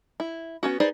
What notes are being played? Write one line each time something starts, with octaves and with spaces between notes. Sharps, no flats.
E4
B3 C#4 F#4
D#4 G#4 B4 C5 D5